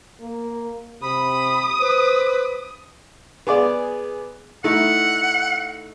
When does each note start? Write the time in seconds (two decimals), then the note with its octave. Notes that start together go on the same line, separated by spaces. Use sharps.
0.21 A#3
1.02 C3 B5 D#6
1.81 B4 C5
3.47 B3 G#4 D5
4.64 A3 D#4 E4 F#5